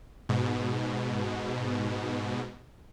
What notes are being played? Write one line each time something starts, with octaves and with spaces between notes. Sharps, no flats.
G#2 B2